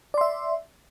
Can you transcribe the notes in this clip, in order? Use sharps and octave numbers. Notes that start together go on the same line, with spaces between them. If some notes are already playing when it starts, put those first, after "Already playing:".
D5 E5 C6